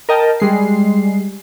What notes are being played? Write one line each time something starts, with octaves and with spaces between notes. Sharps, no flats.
A#4 D#5 G5 A5
G3 G#3 C7